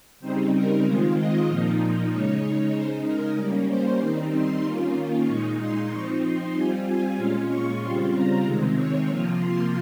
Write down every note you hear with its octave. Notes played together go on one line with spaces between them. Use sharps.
C#3 G3 C4 D#4 C5
A#4
D#3 G#3 C4 F4
D#5
A#2 F3 A#3 D#4
C#3 G#3 D#4 C#5
C#3 G#3 D#4 C5
A#4
G3 A#3 C#4
C5
D#3 G3 C4 D#4
C6
D#3 A#3 C#4 F4
A#2 G#3 D#4 C#6
C6
F3 C4 D#4 C#6
C6
G3 C4 F4 G#5
G#5
A#2 G#3 C#4 F4 F5
C#6
C#3 G3 C4 F4 C6
A#5
C3 D#3 G#3 C4
C#5
C3 F3 A#3 F4
C6